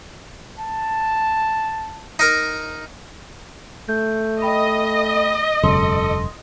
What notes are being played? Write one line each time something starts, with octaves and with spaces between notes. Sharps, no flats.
A5
D#4 A#4
A3 G6
D#5 G5 B5
E1 F#2 C#3 A4 C6